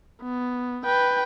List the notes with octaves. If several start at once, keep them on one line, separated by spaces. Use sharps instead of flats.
B3
B4 G5